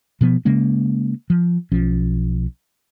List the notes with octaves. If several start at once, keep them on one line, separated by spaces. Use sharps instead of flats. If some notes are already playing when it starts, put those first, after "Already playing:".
B2 F3 B3
C#3 G#3 A#3 C#4
F3
B1 F3 C#4